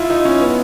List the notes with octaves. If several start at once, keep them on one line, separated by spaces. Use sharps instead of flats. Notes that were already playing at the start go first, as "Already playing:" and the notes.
Already playing: E4 F4
D#4
C#4
B3